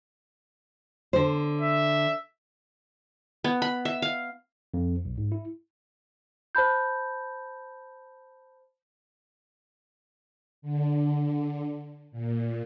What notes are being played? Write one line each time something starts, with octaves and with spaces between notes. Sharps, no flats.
D3 C5
E5
B3
B5
E5
F5
F2
B1
G#2
E4
C5 A5 B5 G6
D3
A#2